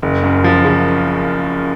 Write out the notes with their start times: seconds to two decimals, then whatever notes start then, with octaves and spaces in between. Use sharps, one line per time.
0.02 F#1
0.23 F#2
0.44 F3
0.64 C#3